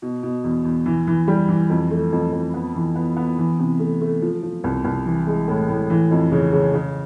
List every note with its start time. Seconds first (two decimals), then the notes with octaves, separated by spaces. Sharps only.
0.02 B2
0.23 B2
0.44 E2
0.64 E2
0.86 E3
1.07 E3
1.28 G3
1.48 E3
1.70 F2
1.91 A3
2.12 F2
2.32 F2
2.54 B3
2.75 E3
2.95 B3
3.17 B3
3.38 E3
3.59 C3
3.79 A3
4.01 A3
4.22 F3
4.43 F3
4.64 C2
4.84 C2
5.06 E3
5.27 G#3
5.48 A2
5.68 A2
5.90 E3
6.11 F2
6.32 C#3
6.53 C#3
6.74 C#3